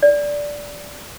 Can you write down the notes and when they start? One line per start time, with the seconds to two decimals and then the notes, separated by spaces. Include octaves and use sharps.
0.03 D5